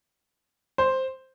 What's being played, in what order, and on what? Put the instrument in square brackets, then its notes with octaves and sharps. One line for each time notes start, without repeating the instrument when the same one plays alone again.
[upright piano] C5